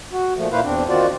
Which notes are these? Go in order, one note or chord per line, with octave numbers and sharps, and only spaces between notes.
F#4
A#2 F3 A3
A#2 A#3 E4 B4 C5 F5
E2 C4 D4
D#3 C4 F4 F#4 D5